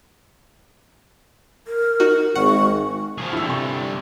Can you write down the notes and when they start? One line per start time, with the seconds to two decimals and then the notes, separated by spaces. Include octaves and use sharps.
1.67 A#4
2.00 D#4 F#4
2.35 G#1 F#5 C#6
3.18 F3 G#4
3.33 G2 D3 E4 E6
3.47 C3 C#6